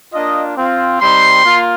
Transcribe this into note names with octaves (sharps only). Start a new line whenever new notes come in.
A#3 D4 F4 D#5
C4 F4
G3 C4 D#4 C6
A#3 F4